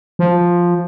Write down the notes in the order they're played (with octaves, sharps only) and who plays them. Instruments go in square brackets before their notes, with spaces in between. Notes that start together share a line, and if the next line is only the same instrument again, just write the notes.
[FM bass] F3